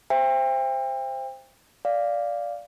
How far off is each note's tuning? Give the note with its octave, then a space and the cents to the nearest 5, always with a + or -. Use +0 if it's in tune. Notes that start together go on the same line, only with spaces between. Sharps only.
C5 +0 E5 +30 G5 +30
D5 -5 F5 +0